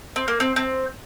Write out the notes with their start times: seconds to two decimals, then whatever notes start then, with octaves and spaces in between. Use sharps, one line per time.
0.16 C4
0.28 A#3
0.40 C4
0.56 C4